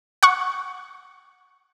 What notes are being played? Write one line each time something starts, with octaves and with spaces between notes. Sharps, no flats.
F#5 C#6